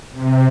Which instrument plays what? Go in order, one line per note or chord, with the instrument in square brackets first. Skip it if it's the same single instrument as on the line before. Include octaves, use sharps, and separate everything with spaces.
[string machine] C3